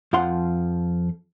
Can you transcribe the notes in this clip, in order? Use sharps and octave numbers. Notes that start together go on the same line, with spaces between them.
F2 F3 F5 F#5 C6